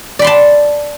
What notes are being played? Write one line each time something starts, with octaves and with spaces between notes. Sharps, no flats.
D5 A5 B5 C6